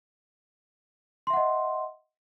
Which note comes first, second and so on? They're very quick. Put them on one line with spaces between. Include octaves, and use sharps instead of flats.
C6 E5 F#5 D#5